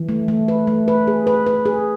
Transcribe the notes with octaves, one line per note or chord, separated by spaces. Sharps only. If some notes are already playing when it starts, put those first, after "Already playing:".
Already playing: E3
A3
A3
B4
A3
B4
G#4
B4
B4
G#4